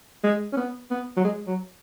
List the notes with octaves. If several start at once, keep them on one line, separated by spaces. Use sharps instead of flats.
G#3
C#4
B3
B3
F#3
G#3
F#3